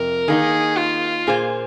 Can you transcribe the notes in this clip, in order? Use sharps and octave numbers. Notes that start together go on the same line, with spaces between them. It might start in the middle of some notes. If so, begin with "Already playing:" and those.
Already playing: F2 C3 A#4
D#3 A#3 D#4 G#4
F4
A#2 A#3 G#4 C5